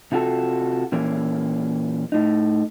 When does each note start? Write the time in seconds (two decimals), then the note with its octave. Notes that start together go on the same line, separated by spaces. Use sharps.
0.12 C3 F4 F#4 A4
0.92 A#2 E3 A#3 C#4
2.12 A2 D#4